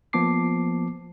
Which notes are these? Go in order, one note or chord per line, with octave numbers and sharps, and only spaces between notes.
F3 A#3 B3 A5 D6 C7